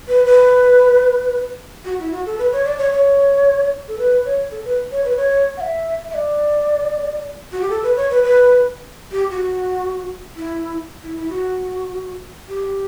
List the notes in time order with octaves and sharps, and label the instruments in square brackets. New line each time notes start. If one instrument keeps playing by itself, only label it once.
[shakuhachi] B4
B4
F#4
E4
F#4
A4
B4
C#5
D5
C#5
C#5
A4
B4
C#5
A4
B4
C#5
B4
C#5
F#5
E5
E5
D5
F#4
G4
A4
B4
C#5
B4
B4
G4
F#4
E4
E4
E4
F#4
G4